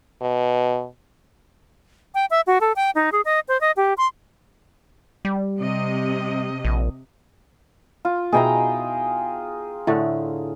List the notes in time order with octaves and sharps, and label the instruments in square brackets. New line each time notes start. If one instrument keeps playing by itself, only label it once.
[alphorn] B2
[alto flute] G5
E5
F#4
A4
G5
D#4
G#4
D#5
C5
D#5
G4
C6
[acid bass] G3
[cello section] C3 D#5
[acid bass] A#1
[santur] F4
[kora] B2 D#4 E4 [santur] G#4 G5 A#5
[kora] A2 D3 A3